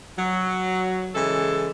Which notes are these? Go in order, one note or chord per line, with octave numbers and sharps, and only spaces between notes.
F#3
C#3 E3 G#3 A4